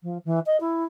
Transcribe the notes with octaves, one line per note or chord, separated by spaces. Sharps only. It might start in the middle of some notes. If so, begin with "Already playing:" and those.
F3
E3
D#5
E4